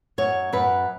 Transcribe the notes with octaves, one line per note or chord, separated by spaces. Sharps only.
F#2 C#5
F#2 B4